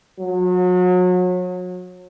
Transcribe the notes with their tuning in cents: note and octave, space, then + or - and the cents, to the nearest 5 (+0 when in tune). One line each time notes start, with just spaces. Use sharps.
F#3 -35